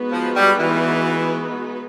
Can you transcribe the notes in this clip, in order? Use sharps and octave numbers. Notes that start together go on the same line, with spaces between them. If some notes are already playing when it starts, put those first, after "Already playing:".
Already playing: G#3 B3 D#4 F#4 B4
F3
G3
E3